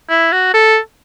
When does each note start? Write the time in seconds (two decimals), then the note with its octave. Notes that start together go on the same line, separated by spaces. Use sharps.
0.10 E4
0.32 F#4
0.54 A4